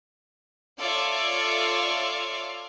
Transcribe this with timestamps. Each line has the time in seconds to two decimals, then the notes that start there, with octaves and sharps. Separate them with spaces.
0.81 F4 A4 C#5 D5 E5 F5